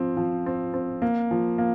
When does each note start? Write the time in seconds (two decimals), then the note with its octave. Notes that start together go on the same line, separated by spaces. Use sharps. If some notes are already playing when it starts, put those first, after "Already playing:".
Already playing: F3 C4
0.17 F3
0.46 C4
0.74 C4
1.02 A#3
1.31 F3
1.58 A#3